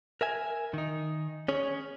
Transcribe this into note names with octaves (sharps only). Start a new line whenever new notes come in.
A#4 E5 G#5
D#3 D#4
C#4 G#4 C#5